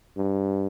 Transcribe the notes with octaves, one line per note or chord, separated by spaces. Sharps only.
G2